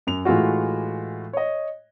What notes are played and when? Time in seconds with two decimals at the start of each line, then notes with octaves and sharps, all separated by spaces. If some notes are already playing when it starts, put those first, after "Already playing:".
0.07 F#2 F7
0.25 A2 E3 G#3 F4 F#4
1.33 C#5 D#5